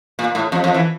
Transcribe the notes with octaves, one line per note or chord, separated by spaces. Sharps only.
A#2
A2
F2
F2
E3